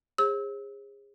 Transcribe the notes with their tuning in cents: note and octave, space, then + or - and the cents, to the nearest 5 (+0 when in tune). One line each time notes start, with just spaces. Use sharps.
G#4 -30 C5 +45 E6 -30